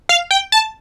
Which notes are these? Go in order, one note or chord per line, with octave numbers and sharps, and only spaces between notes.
F5
G5
A5